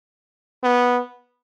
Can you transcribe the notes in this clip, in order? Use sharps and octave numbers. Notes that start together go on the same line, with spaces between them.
B3